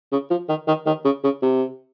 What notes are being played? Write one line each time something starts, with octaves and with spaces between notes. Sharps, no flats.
C#3
F3
D#3
D#3
D#3
C#3
C#3
C3